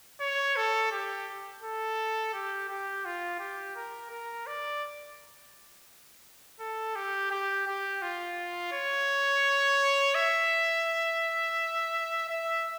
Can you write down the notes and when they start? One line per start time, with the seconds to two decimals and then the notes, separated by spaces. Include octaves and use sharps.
0.21 C#5
0.57 A4
0.92 G4
1.63 A4
2.34 G4
2.69 G4
3.05 F4
3.40 G4
3.76 A#4
4.11 A#4
4.47 D5
6.60 A4
6.96 G4
7.31 G4
7.67 G4
8.02 F4
8.73 C#5
10.15 E5
12.29 E5